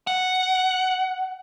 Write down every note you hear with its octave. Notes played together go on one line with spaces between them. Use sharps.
F#5